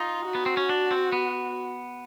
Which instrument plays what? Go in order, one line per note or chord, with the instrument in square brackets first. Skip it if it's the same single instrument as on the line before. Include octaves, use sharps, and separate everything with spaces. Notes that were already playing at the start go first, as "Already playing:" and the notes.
Already playing: [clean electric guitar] D#4 [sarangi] F4
[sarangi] F#4
[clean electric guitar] B3
C4
C#4
D4
C4
B3